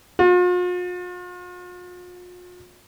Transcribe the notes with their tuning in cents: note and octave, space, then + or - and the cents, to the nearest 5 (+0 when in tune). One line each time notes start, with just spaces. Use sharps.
F4 +45